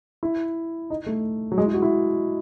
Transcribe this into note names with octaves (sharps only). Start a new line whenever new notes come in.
E4
D#4
A3
F#3
G#3
E4
F#4
E4